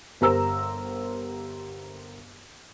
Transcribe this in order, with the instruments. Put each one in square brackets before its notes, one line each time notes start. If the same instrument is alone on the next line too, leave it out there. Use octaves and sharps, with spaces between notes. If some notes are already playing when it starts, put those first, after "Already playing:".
[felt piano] G1 G4 A#4 C5 A#5 E6